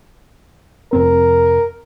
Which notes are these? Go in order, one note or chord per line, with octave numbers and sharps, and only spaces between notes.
F1 C4 A#4